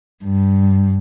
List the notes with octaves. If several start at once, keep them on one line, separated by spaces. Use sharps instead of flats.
G2